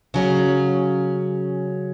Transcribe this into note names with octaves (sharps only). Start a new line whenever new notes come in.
C#3 F#3 C#4